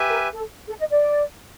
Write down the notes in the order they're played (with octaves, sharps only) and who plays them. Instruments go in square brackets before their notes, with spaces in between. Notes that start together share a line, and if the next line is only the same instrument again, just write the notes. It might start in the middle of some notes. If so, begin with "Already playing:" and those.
Already playing: [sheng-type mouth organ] G4 B4 E5 G#5
[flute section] A#4
A4
A4
D#5
D5